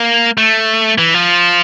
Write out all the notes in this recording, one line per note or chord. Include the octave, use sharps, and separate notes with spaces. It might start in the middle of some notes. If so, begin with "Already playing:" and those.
Already playing: A#3
A3
E3
F3